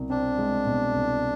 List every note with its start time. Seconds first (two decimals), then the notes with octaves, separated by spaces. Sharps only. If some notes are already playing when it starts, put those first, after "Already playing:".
Already playing: C2 B2
0.10 C4 D4
0.39 G#3
0.66 B2
0.94 C2